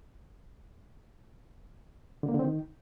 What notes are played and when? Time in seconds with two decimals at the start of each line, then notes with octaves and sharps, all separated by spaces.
2.23 D3
2.29 A#3
2.34 D3
2.39 C4
2.45 D#3